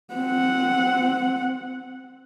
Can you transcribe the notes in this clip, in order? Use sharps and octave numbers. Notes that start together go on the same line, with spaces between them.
C4 F#5